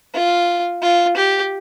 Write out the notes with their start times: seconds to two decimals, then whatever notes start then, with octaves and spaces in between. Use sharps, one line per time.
0.14 F4
0.82 F4
1.16 G4